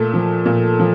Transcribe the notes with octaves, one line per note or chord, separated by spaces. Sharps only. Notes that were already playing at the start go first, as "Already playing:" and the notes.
Already playing: A#2 A3 A4
F3
A#2
F3